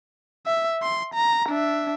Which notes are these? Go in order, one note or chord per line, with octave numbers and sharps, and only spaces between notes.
E5
C6
A#5
D4 E5